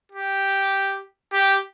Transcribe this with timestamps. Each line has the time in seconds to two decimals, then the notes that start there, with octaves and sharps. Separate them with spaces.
0.12 G4
1.33 G4